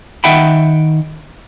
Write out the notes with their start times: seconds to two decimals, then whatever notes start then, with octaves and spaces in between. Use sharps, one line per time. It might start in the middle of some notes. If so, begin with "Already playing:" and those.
0.24 D#3 E5 F#5 G5 B5